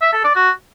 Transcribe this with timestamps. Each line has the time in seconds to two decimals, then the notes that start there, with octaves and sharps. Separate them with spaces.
0.01 E5
0.13 A4
0.24 D5
0.35 F#4